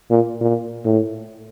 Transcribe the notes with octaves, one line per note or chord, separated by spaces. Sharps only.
A#2
A#2
A2